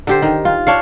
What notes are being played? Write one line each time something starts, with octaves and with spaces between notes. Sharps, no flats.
D3 G4 C5
D#3
F4
D4 C#5 F5